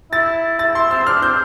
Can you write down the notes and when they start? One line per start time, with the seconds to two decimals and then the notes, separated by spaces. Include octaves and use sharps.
0.12 E4 A6
0.59 E4 A6
0.75 E4 C6
0.91 C4 E6
1.07 D4 F6
1.22 C4 G6